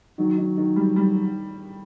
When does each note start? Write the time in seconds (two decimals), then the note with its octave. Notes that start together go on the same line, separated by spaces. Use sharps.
0.18 D#3 F#3
0.38 D#3
0.57 D#3
0.76 G3
0.96 G3